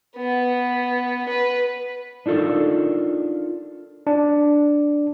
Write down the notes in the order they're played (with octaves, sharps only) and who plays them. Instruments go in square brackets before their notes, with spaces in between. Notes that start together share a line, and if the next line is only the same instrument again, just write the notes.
[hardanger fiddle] B3
B4
[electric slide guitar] D4 D#4 F4 A4 A#4
[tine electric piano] D4